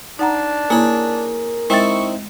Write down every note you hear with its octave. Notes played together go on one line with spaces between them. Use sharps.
D4 D#4 F#5 A#5
A#3 E4 G#4 A#4 C#5
G#3 C4 D#4 E4 G5 C#6 A6